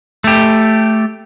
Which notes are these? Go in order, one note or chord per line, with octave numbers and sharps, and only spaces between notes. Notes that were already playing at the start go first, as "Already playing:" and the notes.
A3 G4